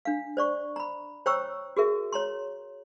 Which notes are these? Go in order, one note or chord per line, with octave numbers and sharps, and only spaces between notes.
D4 F5
C5 D5 C#6
A#5 B5
C5 C#5 G5 A#5 C#6 E6
F#4 G#4 A#4 E5
C#5 A#5 C6